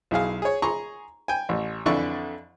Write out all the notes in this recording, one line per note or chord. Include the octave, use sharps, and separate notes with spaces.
B1 E4 G#4 F5
G#4 C#5
G#4 A#5 C6 C#6
G5 G#5
A1
F2 D3 E3 D5 E5 C#6